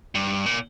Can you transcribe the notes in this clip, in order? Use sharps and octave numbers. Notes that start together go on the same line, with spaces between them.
G2
A#2